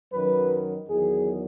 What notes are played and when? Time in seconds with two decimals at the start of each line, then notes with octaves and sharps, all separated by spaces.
0.13 F#2 D#3 F#3 B4
0.89 E2 D#3 F#3 G#4